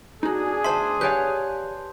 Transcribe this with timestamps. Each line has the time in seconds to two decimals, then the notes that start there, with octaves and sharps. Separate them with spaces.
0.23 D4 D#4 F#4 G#4
0.64 D2 C5 E5 A5 C6
1.01 G4 B4 C#5 D5 F5 G#5 G6